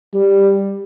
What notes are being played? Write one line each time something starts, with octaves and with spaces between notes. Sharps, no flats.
G3